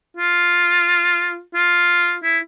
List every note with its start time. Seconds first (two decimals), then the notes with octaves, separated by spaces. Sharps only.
0.17 F4
1.55 F4
2.23 E4